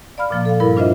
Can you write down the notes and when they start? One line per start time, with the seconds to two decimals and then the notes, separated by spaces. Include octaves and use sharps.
0.18 D5 F5 B5 F6
0.30 A#2 F3 A#3
0.45 A4 F5
0.60 G2 G3 E4 A#4 B5
0.77 D4 F4 C5 D#5 E5